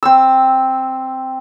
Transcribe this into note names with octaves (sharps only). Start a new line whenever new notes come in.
C4 E6